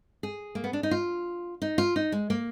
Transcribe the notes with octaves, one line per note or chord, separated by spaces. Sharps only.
G#4
A#3
B3
D4
D#4
F4
D#4
F4
D#4
G#3
A#3